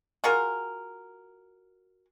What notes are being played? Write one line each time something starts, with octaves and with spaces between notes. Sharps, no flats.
F4 F#4 G#4 A#4